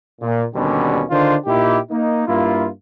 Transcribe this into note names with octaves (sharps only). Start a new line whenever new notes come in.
A#2
D#2 B2 D3 G3 C#4
D3 D#3 D4 F4 C5
A#2 D#4 E4 G4
A#3 D#4
G2 A#3 E4 F4